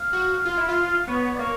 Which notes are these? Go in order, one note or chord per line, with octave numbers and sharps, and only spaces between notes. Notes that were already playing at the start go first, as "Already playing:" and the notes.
Already playing: F5
F#4
F4
E4
F4
B3 C#5
D5
A#3 C#5